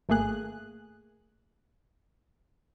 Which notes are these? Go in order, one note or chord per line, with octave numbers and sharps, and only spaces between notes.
G#1 A3 A#3 G#4 F#6